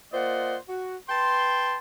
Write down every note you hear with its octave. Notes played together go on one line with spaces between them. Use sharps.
A#3 F4 C5 D5 D#5 F#5
F#4
B4 G5 A5 C6